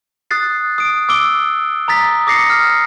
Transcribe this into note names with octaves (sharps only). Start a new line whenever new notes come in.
D#6 F#6 A6 C7
D#6 D7
D6 E6 D7 G7
A#5 D#6 A6 B6
D6 D#6 A#6 C7 C#7
F6